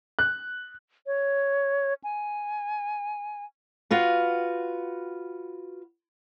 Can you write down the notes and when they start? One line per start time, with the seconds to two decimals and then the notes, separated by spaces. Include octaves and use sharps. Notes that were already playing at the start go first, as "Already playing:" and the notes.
0.19 F#6
1.07 C#5
2.04 G#5
3.91 F4 F#4 B4